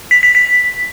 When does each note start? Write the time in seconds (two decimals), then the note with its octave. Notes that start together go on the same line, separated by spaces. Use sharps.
0.11 B6
0.23 B6
0.35 B6